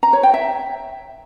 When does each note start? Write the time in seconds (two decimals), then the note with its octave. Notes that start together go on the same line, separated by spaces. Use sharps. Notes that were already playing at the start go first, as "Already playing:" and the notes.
0.03 A#5
0.13 C#5
0.23 G5
0.34 E5